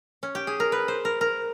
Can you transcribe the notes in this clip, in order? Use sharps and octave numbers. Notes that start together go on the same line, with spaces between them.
C#4
G4
G#4
A#4
B4
C5
A#4
A#4